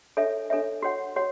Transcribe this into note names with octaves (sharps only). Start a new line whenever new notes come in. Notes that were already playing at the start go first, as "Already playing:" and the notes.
D4 A4 C#5 E5
D4 A4 C#5 E5
F#4 C#5 F#5
F#4 C#5 F#5